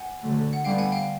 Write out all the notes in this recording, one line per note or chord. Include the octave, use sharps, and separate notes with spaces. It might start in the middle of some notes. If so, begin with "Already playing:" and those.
Already playing: F#5 G#5
D3 F#3 A3
F#5
D3 G3 B3 F5 G5
F#5 G#5
F5 G5